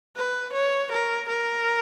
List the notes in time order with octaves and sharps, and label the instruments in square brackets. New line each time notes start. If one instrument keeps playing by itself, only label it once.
[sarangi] B4
C#5
A#4
A#4